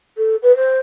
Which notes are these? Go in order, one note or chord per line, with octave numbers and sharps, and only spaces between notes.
A4
B4
C5